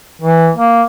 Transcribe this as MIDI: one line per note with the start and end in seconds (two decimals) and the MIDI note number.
0.22 0.50 52
0.55 0.83 58